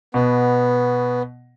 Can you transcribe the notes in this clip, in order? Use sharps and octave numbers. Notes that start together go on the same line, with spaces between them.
B2 B3